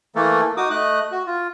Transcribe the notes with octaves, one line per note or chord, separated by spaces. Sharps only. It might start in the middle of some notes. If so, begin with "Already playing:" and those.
E3 A3 A#3 A4
D#4 F#4 D6 D#6
A3 D#5 F#6
F#4
F4